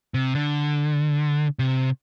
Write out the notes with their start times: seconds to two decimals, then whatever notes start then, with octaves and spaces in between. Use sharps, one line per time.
0.14 C3
0.35 D3
1.59 C3